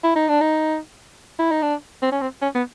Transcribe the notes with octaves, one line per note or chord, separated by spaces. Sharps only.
E4
D#4
D4
D#4
E4
D#4
D4
C4
C#4
C4
C#4
B3